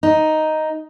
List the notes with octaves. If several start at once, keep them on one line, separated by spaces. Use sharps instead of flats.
D#4